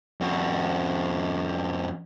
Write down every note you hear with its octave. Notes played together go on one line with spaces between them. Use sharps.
F2 F#4